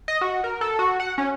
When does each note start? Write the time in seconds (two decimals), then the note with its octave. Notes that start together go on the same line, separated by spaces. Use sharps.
0.08 D#5
0.21 F#4
0.44 A#4
0.61 A4
0.79 F#4
1.00 F#5
1.18 C#4